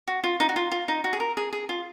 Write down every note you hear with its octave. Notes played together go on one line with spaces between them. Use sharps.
F#4
F4
D#4
F#4
F4
F4
D#4
F#4
G#4
A#4
G#4
G#4
F4